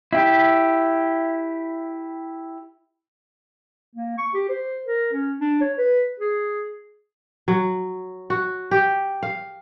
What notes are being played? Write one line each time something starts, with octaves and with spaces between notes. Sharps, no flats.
E4 G4
A#3
C#6
G4
C5
A#4
C#4
D4
C#5
B4
G#4
F#3
F#4
G4
F5